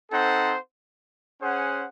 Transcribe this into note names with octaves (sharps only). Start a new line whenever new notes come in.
C4 D#4 A4 C5 F#5
C#4 G#4 C5 F#5